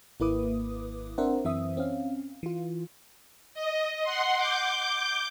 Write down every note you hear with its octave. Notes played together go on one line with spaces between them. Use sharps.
G#1 A#3 E4 B4 D6 D#6
C4 D4 A#4 C5 E5 F#5
F#2 E3 C4 E5 D#6
C4 C#4 F5
E3 F4
D#5
F#5 C6
D6 G6